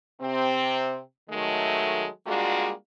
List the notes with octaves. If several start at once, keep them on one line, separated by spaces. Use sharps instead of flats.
C3 C4
D#3 F#3 G#3 A3
G3 G#3 A#3 D4 F4 F#4